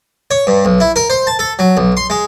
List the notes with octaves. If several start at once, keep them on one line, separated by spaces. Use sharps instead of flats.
C#5
G2
B1
E4
A#4
C5
A5
A4
F#3
B1
C6
G#3